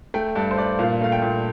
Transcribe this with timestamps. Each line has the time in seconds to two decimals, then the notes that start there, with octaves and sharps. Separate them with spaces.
0.14 A3 G5
0.35 G2 A5
0.51 C5
0.57 G2 D5
0.79 A#2 F5
1.01 A3 F5
1.12 G5
1.22 A#2